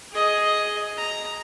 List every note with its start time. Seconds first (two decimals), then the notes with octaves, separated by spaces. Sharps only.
0.12 G#4 D#5
0.97 A#5